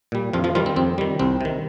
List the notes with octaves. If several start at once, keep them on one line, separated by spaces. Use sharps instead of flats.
A#2 G3
F2 F3 F4
F3 F4
D#3 F3 G3 F4
C4
F2 C4
D#3 G3
C2 C4
C3 D#3